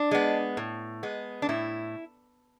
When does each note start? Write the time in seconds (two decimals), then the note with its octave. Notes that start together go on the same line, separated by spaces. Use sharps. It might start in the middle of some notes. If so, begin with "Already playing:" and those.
Already playing: D4
0.11 G#3 B3
0.57 A2
1.03 G#3 B3
1.42 D4
1.49 A2 E4